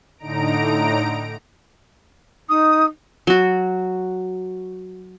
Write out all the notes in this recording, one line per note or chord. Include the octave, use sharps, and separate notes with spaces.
A2 D3 D#4 A#5 D7
D#4 D#6
F#3 F#4